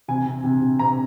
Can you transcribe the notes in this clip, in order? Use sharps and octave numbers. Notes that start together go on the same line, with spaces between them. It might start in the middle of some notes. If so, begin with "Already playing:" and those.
C3 G#5
C3
C3
C3
C3 A#5